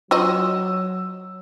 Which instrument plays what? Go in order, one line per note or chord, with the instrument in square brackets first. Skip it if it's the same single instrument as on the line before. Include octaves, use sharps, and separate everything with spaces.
[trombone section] F#3 [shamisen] F4 F#4 D#5 [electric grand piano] E6